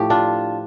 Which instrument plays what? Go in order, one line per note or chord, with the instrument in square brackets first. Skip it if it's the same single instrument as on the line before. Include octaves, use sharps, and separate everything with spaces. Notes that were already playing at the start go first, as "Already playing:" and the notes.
Already playing: [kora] A2 F3 G4
D4 F4